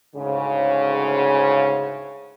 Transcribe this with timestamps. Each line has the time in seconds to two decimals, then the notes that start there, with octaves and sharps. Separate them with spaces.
0.16 D2 G#2 C#3